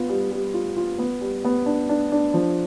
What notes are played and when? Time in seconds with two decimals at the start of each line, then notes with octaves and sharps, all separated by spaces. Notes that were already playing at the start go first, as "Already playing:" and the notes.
Already playing: B3 F4
0.09 G3
0.31 G3
0.54 F4
0.77 F4
0.98 B3
1.21 G3
1.45 B3
1.66 D4
1.89 D4
2.12 D4
2.34 F3